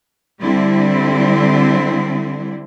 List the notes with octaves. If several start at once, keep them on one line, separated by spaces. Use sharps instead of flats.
D3 G3 C4 E4